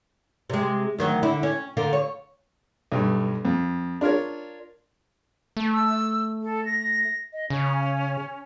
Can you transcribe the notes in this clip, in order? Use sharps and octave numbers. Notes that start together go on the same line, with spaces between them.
C3 G#3
D2 D#3 F#3
D3 E4
C#4
D3 F4 A#4
C#5
B1 G2
F2
D4 F4 A#4 C#5
A3
E6
A4
A#6
D#5
C#3 C#4